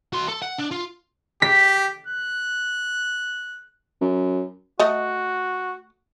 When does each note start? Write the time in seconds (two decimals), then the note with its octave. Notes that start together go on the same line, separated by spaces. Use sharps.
0.13 F#4 C6
0.29 A4
0.42 F#5
0.59 D4
0.72 F4
1.42 G4 B6
2.07 F#6
4.01 F#2
4.80 A3 F#4 D#5